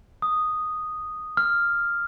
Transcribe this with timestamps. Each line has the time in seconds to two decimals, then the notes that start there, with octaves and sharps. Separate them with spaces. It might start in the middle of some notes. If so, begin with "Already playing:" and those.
0.22 D#6
1.37 F6